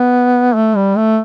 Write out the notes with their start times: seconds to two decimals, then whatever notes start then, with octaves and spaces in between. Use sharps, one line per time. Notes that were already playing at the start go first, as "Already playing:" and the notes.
Already playing: B3
0.55 A3
0.76 G3
0.97 A3